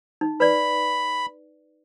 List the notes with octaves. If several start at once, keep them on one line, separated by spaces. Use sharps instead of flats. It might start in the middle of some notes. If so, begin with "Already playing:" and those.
D#4
B4 D5 B5